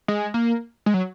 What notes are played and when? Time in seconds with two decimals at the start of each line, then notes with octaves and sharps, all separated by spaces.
0.08 G#3
0.34 A#3
0.86 G#3
0.94 F#3